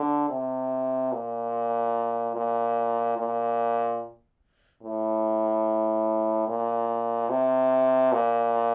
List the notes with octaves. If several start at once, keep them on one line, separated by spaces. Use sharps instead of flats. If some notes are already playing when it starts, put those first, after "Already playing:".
Already playing: D3
C3
A#2
A#2
A#2
A2
A#2
C3
A#2